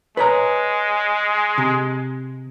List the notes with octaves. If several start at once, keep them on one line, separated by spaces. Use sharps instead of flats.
G#3 B4 C#5 A#5
C3